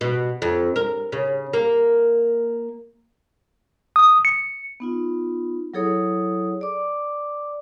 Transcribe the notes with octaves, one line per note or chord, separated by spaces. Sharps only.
B2
F2
A#4
C#3
A#3
D#6
C#7
B3 D#4 F4
F#3 E4 G#4 A4 C#5 D#6
D5 D6